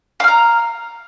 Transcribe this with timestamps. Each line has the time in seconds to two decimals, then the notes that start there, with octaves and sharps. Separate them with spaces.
0.20 F5
0.24 F6
0.28 A#5